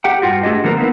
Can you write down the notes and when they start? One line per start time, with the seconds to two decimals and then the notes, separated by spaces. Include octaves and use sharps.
0.04 G4 F#5 G5
0.22 G2 F4 F#4
0.43 A3 D4 G4 G#4 D#5
0.64 D3 F3 A#3 A#4 B4
0.77 A#3 B3 D#4 E4